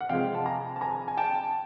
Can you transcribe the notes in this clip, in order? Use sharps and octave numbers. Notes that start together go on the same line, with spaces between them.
F#5
C3 F3 G#3 F5 G5
A5
G#5 A#5
A5
G#5 A#5
G#5
G5 A5